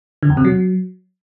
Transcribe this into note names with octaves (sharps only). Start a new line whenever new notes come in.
D3
E2
C3
F#3